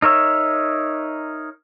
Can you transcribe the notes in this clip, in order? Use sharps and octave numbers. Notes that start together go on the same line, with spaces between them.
D#4 A#4 C#5 E5